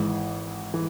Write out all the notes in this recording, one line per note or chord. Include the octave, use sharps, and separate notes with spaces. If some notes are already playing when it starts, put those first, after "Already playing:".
Already playing: G#1 G#2 E3
E3